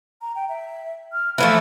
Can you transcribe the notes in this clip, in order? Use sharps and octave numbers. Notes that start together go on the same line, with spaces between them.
A#5
G5
E5
F6
E3 F3 A3 B5